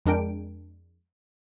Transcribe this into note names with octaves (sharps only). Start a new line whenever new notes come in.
F2 G#3 D4 A#4 G5 D7